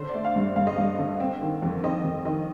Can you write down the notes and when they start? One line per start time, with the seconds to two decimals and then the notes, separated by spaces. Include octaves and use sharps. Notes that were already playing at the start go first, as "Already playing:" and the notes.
Already playing: D3 C5
0.09 D5
0.14 A3
0.25 F5
0.36 G2
0.56 G2 F5
0.67 D#5
0.76 G2 F5
0.99 D3
1.20 C4
1.41 D#3
1.62 F2
1.83 C4 D#5
2.04 F2
2.25 D#3 D#5